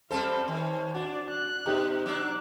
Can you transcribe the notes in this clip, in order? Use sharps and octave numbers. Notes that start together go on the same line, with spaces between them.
G3 C4 A4 C5 F5 A5
D#3 C#5
D4 F#4 D5
F#6
B2 D#4 G4
F#3 D4 D6 F#6